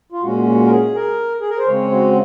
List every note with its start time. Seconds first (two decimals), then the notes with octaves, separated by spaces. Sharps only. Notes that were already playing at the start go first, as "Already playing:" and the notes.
0.12 F4
0.22 A#2 G#3 C#4 F#4
0.46 F#4
0.66 A#4
0.71 G#4
0.95 A#4
1.41 G#4
1.50 A#4
1.59 C5
1.67 C#3 G#3 C4 C#5
1.92 F#4